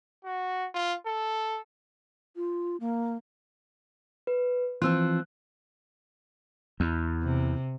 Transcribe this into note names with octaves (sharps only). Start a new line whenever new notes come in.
F#4
F4
A4
F4
A#3
B4
E3 F3 C4 F4 E6 F#6
E2
C3